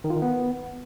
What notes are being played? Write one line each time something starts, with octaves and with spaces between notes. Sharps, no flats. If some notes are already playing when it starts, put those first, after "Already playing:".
D#3
F4
D#3
B3